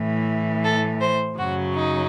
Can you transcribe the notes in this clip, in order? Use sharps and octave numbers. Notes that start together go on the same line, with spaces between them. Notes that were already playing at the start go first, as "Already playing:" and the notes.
Already playing: A2 E3
A4
C5
F#2 C#3 F#3 F#4
D#4